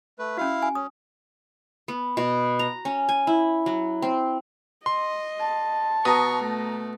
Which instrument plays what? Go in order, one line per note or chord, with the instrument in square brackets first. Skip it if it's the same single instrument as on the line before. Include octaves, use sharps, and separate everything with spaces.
[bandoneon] A3 B4
[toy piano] C#4 F#4 [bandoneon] E4 F5
[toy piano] G#5
[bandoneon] C#4 [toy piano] D#6
[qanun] B3
B2
A#5
C#4
G#5
E4
F#3
C4
[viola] D#5 [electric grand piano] C6
[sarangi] A5
[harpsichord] B2 [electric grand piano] A#5 D#6 [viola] C#6
[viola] A3